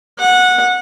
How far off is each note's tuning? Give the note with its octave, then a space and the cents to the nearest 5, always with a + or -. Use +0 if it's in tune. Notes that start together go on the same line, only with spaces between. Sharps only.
F#5 -15